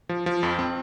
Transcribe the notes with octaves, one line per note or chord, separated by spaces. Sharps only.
F3
F3
F2
C4